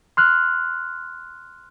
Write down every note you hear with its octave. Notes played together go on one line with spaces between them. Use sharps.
C6 F6 F#6